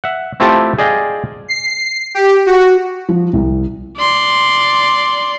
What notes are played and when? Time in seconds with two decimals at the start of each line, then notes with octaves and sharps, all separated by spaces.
0.04 E5 F#5
0.40 A3 C4 E4 F4 G4 A4
0.78 G#4 D5 D#5 F5 G5
1.48 C7
2.15 G4
2.46 F#4
3.09 F3
3.33 C2
3.97 D5 C6